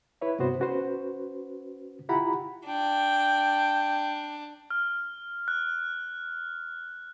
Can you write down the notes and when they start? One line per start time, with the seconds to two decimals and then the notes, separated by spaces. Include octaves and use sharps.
0.21 E4 B4 C#5 E5
0.39 G2 C3 B3 F#4 C5
0.60 C#4 F#4 B4 C5
2.09 E4 F4 G4 F#5 A#5 B5
2.66 D4 G5
4.71 F6
5.48 F#6